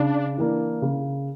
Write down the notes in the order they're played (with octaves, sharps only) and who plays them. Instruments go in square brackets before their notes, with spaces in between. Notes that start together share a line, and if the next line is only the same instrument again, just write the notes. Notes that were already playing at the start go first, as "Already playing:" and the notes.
Already playing: [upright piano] C#3 [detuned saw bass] D4
[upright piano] E3 A#3 D4
C#3